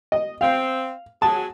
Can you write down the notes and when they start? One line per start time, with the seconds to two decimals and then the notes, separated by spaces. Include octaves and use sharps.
0.12 D#5
0.41 C4 F5
1.22 F#3 G#4 A5